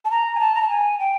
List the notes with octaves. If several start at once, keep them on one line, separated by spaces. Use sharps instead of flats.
A5
A#5
G#5
A5
A#5
A5
G#5
G5